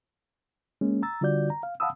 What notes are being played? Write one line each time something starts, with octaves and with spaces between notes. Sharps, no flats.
G#3 A#3 C#4
A#5 E6 A6
D3 G3 F4 F#4 D5 G6
A#5
F5
F5 F#5 A5 B5 D#6 E6